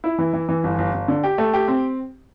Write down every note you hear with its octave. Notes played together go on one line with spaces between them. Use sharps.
E4
E3
E3
E3
G1
G1
G1
D3
G4
A3
G4
C4